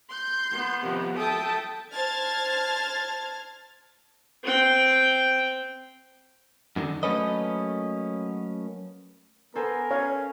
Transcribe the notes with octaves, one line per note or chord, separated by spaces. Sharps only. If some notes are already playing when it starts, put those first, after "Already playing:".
C6 G6
B3
C3 D#3 F3
A4 E5 G5 A5 D#6
C5 A5 F6 G#6 A6
C4 G5
F#2 A2 D3 D#3
F#3 A3 A#3 C#4 B4 D#5
B3 A4 A#4 C5 G#5
C#4 C#5 F5